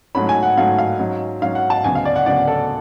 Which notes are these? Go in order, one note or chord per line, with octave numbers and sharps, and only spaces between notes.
G#2 F#3 A3 C#4 B5
G#5
F#5
G#2 F#3 A3 C#4 F5
F5
G#2 F#3 C#4
G#2 F#3 C#4 F5
F#5
A5
D2 C#3 F#3 B3 G#5
F5
D5
F#5
D2 C#3 F#3 B3 D5
A4